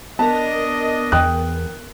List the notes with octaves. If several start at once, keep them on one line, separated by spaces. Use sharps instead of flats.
B3 D4 A#4 D#5 A5
E2 G5 D#6 F#6